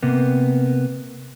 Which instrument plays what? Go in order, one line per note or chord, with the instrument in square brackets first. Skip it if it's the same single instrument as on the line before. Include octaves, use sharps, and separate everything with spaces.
[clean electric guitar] C3 A#3 B3